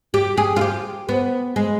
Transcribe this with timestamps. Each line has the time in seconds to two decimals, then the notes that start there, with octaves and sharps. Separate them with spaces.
0.14 G4
0.38 G#4
0.56 F4
0.61 G4
1.09 B3
1.56 G#3